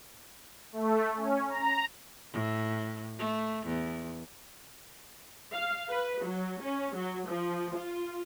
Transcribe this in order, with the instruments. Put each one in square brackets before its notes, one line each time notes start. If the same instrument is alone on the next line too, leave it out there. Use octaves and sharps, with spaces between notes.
[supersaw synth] A3
C#4
A#5
[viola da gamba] A2
A3
E2
[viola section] F5
B4
F#3
C#4
F#3
F3
F4